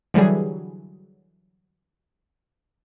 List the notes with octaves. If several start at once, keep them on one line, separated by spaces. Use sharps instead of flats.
D3 E3 F#3 G3 G#4